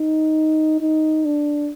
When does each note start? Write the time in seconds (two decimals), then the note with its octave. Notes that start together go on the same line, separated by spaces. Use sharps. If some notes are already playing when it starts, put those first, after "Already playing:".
Already playing: D#4
0.80 D#4
1.25 D4